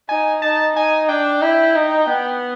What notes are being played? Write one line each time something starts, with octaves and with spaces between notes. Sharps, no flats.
D#4 G#5
D#4 A5
D#4 G#5
D4 G5
E4
D#4
B3